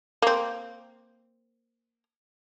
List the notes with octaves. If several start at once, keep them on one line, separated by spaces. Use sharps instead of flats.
A#3 C4